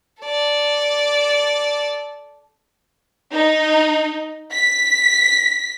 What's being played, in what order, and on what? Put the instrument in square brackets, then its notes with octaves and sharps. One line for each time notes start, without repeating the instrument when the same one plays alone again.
[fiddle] A4 D5
[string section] D#4
B6